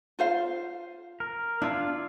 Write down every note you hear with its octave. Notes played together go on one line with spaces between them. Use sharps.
F4 C5 F5
A#4
D4 E4 F4 F5